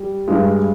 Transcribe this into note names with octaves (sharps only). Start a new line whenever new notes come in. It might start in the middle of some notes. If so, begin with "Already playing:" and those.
Already playing: G3
G2 G#3